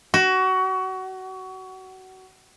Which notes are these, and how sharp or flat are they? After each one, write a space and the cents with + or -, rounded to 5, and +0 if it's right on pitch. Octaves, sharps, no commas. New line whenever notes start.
F#4 +25